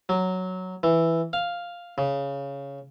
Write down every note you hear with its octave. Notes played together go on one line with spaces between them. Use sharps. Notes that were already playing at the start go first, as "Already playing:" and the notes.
F#3
E3
F5
C#3